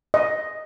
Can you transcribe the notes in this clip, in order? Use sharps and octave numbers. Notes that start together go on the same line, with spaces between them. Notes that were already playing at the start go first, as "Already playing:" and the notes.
D#5